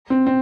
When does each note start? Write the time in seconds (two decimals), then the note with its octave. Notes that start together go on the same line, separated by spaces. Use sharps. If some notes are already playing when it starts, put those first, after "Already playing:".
0.10 C4
0.27 C4